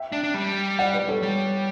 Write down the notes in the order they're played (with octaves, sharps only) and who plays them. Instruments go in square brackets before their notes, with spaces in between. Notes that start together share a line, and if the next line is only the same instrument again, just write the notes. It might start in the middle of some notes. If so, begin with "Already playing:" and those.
Already playing: [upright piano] E5 G5
[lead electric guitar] D4
D4
G3
[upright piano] D5 F#5
B4 D5
A4 C#5
[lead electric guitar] G3